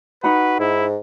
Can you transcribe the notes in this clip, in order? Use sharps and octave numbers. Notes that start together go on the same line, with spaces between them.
D#4 F#4 B4 F#5 B5
G#2 E4